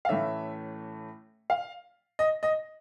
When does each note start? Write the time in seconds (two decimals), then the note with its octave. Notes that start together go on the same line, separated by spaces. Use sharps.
0.05 F5
0.09 A2 E3 A3 C#4 E5
1.50 F5
2.19 D#5
2.43 D#5